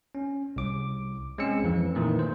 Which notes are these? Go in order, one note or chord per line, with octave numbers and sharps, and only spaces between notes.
C#4
C2 D6
G#3 C4 C#4 E6 C#7
F2 E3
A#2 D#3 E3 A3
C5